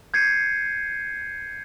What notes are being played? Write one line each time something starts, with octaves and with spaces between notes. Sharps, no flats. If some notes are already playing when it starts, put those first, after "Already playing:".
G6 G#6 C7 C#7 D#7